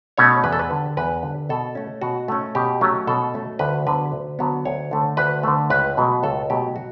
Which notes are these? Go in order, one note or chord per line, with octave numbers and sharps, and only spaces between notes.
B2 A3 C#4 C#5
E2 B4
A4
B4
D3 G3
E2 B4
D3 G3
B2 A4
A3 C#4
B2 F#4
A3 C#4
B2 G4
F#3 A3 C#4
B2 A4
F#3 A3 C#4
D2 B4
D3 F#3 B3 B4
D2
D3 F#3 B3
D2 C#5
D3 A3
D2 B4
D3 A3
C#2 B4
B2 F#3 A3
C#2 A4
B2 F#3 A3 G4
F#4